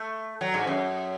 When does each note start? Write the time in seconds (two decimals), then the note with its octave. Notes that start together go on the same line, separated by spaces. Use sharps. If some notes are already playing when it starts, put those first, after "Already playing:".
Already playing: A3
0.41 F#3
0.54 G#2
0.67 F#2